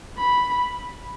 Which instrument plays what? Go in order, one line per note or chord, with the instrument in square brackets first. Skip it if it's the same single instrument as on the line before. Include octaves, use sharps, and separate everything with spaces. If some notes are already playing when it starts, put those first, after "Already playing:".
[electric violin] B5